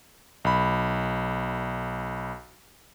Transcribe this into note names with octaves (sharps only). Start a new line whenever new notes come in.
B1 B5